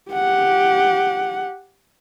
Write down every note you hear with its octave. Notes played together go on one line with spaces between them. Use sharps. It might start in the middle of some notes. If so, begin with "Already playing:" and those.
G4 F#5